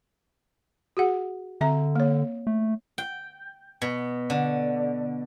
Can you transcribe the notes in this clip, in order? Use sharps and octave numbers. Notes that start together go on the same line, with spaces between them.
F#4 G#4 F#5
D3 C4 E5 A#5
A#3 C#5
A3
G5
B2
D3